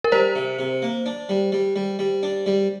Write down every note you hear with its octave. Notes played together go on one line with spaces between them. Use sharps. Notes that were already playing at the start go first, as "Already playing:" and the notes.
A#4
G3 C5
C3
C3
A#3
D4
G3
G3
G3
G3
D4
G3